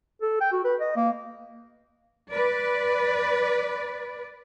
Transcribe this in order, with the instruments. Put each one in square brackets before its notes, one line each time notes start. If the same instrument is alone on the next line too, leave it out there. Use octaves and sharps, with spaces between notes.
[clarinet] A4
G5
F#4
B4
D#5
A#3
[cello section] B4 D5